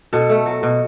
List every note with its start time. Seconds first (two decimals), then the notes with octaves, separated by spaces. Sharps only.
0.13 B2 A4
0.30 A3
0.46 F#3
0.63 B2